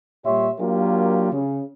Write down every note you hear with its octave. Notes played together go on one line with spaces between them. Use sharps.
A#2 G3 G4 C#5 E5 C6
F#3 A#3 D4 F4 G4 A#4
C#3